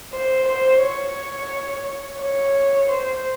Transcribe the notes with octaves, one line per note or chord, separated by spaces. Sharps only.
C5
C5
C#5
C#5
C5